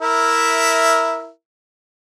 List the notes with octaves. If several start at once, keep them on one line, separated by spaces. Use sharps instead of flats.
E4 A#4 E5